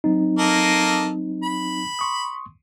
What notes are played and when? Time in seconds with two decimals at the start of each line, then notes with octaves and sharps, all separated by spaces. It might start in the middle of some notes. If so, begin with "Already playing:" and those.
0.04 F#3 C4 D#4
0.39 A#3 A4 D#5
1.43 B5
1.99 C6 C#6 D#6